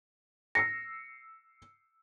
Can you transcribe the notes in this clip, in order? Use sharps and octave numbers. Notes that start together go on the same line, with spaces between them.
E6 A#6 C7 C#7